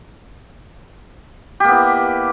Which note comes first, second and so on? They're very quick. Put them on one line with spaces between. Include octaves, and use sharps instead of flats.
G4 A#3 B3 E4